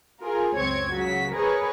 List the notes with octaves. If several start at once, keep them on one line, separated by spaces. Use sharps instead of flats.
F4 G#4 A#4
C#2 F#2 C4 C#5 G#6 C#7
C#3 F#3 F#4 B6
G#4 A#4 B4 C#5